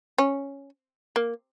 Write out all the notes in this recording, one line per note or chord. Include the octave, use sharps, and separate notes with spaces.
C#4
A#3